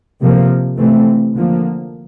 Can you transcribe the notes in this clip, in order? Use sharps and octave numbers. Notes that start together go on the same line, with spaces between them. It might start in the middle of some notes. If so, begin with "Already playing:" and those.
C3 F3 A#3
C3 E3 A3 C4
D3 F3 A#3